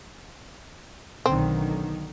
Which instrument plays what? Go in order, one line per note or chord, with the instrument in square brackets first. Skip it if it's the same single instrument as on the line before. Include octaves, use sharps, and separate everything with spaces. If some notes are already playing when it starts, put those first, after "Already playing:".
[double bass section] B1 D3 D#3 [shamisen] C4